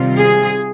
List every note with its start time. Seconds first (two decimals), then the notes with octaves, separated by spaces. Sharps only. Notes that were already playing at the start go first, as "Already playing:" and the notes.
Already playing: C3 D#3 G3 C4 F4
0.19 G#4